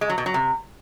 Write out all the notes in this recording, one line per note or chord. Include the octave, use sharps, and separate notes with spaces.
G#3
F#3
B2
F#3
C3